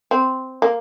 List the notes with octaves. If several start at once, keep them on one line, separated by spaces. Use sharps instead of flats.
C4
A#3